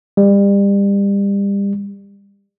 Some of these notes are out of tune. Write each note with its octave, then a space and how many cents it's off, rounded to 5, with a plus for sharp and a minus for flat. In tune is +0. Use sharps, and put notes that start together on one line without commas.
G3 +30